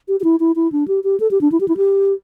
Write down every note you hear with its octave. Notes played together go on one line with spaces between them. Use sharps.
G4
G4
E4
E4
E4
D4
G4
G4
A4
G4
D4
E4
G4
E4
G4